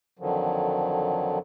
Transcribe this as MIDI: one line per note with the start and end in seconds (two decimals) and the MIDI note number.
0.19 1.38 41
0.19 1.38 50
0.19 1.38 51
0.19 1.38 53
0.19 1.38 54